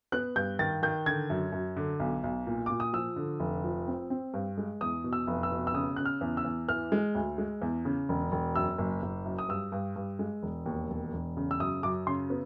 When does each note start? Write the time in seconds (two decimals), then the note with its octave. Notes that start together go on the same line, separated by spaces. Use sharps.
0.12 B3 F#6
0.36 G2 G6
0.59 D#3 A6
0.83 D#3 G6
1.06 D3 G#6
1.30 F#2
1.52 F#2
1.77 D3
2.00 B1
2.24 B1
2.47 A#2
2.66 A#2 D6
2.80 D#6
2.93 F3 E6
3.16 D3
3.40 F1
3.64 F3
3.87 C4
4.10 C4
4.34 G2
4.57 G#3
4.81 E2 D#6
5.04 B2
5.13 E6
5.27 F1
5.43 E6
5.51 B2
5.67 E6
5.74 C#3 D#6
5.96 C#3 F#6
6.05 F6
6.21 E2
6.37 E6
6.45 E2
6.68 E3 F6
6.92 G#3
7.15 D2
7.38 G#3
7.62 E2
7.85 C#3
8.09 E1
8.32 E1
8.56 F#2 E6
8.78 F#1
9.02 F#1
9.25 F#2
9.39 D#6
9.49 G2 E6
9.72 G2
9.96 G2
10.19 G#3
10.43 E1
10.66 D#2
10.90 E1
11.13 E1
11.37 C#3
11.51 E6
11.60 F#2 D#6
11.83 F#2 D6
12.07 C#3 C6
12.30 B3